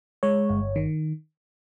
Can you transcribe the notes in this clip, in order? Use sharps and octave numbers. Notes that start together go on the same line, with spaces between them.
G#3 C#5
G1
D#3